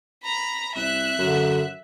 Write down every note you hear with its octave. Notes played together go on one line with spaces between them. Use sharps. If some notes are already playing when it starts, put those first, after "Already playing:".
A#5 B5
C2 E5 F#6
F#2 D3